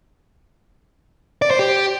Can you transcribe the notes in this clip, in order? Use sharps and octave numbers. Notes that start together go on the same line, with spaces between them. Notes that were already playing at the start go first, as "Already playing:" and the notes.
D5
C5
G4